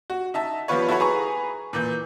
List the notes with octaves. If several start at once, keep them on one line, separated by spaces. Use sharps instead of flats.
F#4
D#4 E5 A5
F3 G3 B3 F4 B4 C#5
E4 F#4 A4 B4 C#5
G#4 B4 A#5 C#6
A#2 E3 G6